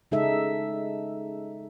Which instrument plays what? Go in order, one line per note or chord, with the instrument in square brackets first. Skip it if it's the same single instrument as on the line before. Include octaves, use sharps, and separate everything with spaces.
[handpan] C#3 G#3 D#4 G#4 A4 E5